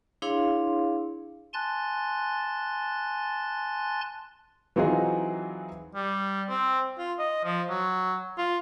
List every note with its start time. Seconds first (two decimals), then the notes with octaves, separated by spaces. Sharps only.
0.22 D4 E4 G#4 C#5 F5 C6
1.53 G#5 A5 C6 F#6 A6
4.76 E3 F#3 C4 D#4 F4 G#4
5.95 G3
6.49 C4
6.98 F4
7.19 D#5
7.44 F3
7.70 F#3
8.37 F4